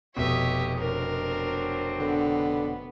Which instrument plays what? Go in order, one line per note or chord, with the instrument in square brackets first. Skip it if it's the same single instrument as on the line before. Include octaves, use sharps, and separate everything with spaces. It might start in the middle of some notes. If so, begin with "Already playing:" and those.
[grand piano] F1 B2 [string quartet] G4 C#5 D#5 [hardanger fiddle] E5
[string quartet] F#3 C4 D4 [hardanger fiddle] A#4
[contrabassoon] D3 [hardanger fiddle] B3